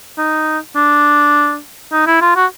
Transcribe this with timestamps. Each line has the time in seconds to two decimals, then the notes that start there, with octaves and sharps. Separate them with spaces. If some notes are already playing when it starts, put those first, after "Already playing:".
0.18 D#4
0.76 D4
1.92 D#4
2.07 E4
2.21 F4
2.36 F#4